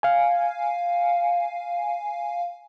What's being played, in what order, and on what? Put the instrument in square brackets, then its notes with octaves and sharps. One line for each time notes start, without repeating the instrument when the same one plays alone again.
[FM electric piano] F5 G#5